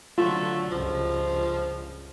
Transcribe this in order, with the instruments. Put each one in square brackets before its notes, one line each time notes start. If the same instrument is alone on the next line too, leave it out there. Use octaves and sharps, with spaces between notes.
[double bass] D3 F#3 [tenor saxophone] A3 [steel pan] F4
[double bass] C#2 G2 [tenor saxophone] F3